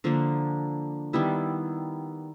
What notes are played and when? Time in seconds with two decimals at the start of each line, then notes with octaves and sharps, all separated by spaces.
0.04 D3 F3 A#3 D4
1.13 D#3 G3 B3 E4